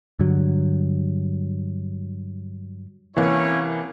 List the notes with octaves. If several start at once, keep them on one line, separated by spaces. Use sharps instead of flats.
G2 D3 F#3
C2 C3 E3 A#3 C#4 E4 C#5